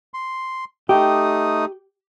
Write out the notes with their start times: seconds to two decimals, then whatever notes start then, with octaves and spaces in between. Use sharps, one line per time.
0.14 C6
0.89 A3 D#4 G4 D#6